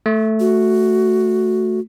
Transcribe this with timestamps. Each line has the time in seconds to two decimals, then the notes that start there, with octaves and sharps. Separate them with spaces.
0.06 A3
0.40 F#4